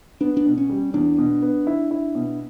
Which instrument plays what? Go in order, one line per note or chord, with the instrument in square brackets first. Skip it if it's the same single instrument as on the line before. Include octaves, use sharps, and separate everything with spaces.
[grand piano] B3 [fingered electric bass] D4
[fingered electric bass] D4
[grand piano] B2
[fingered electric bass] C#4
[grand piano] G3
[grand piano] E2 [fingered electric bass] D4
[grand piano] B2
B3
E4
E4
B2